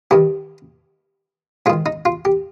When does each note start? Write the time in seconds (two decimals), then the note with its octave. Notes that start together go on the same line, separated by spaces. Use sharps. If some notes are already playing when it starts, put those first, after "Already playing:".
0.11 G2 D#3 G4
1.66 G#2 F4
1.70 D#3
1.86 D#4
2.05 F4
2.25 G4